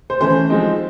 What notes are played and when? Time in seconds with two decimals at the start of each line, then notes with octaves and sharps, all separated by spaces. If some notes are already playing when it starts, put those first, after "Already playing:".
0.10 C5
0.21 E3 A3 C#4 C5
0.50 F3 G#3 C4 D#4